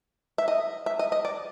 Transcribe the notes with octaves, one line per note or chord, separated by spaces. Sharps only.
E5
D#5
E5
D#5
D#5
D5